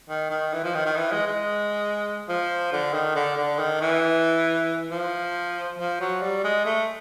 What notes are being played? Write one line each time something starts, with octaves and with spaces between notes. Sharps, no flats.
D#3
D#3
E3
F3
D#3
D#3
E3
G#3
G#3
F3
D3
D#3
D3
D3
D#3
E3
F3
F3
F#3
G3
G#3
A3